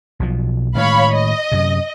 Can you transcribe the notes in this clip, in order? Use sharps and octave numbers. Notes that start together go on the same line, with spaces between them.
B1 B2 F3
A2 D#3 G#3 C#5 F5 B5
D#5
F#2 C3